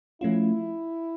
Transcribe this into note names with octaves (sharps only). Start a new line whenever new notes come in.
F3 A3 C#4 E4 F4